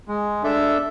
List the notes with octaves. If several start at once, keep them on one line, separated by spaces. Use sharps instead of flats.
G#3
D4 A4 E5